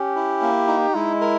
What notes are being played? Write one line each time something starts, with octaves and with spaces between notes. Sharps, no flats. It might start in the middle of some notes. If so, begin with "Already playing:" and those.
Already playing: C#4 G4
E4
A#3
D#4
G#3 E4
A#4